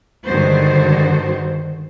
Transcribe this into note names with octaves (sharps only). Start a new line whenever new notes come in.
G2 D3 D#3 G#3 F#4 C5